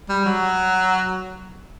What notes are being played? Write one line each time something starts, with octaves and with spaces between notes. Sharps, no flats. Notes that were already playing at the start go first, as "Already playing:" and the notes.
G3
F#3